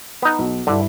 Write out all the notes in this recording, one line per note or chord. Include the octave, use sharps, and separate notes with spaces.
B3 D#4
B1
G2 D3 E4